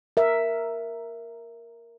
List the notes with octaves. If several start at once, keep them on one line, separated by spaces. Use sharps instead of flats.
A#4 E5